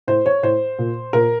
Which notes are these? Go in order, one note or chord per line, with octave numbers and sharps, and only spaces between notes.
A2 C5
C#5
A2 C5
A#2
A#2 A#4